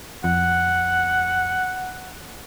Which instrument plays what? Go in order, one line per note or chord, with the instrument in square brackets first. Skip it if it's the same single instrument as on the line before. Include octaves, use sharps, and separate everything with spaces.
[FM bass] F2 [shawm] F#5